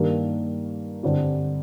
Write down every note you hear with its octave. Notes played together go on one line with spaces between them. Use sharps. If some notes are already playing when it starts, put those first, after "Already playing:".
Already playing: G2 D#3 A#3 D4 G4
G2 D3 G3 C4 G4